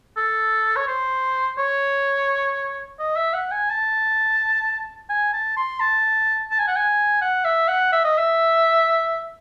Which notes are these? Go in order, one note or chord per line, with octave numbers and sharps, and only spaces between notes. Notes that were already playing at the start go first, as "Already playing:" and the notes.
A4
C#5
C5
C#5
D#5
E5
F#5
G#5
A5
G#5
A5
C6
A5
A5
G#5
F#5
G#5
F#5
E5
F#5
E5
D#5
E5